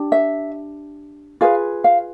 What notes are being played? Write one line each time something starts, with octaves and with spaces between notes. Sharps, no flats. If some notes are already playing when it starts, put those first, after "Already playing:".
Already playing: D4 G4
E5
F4 G#4 B4 F5
F5